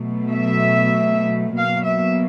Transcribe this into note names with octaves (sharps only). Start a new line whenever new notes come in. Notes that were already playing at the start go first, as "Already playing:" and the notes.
Already playing: B2 F#3 A3
E5
B2 F#3 A#3 F5
E5